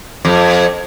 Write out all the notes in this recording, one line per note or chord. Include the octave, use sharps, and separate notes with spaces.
F2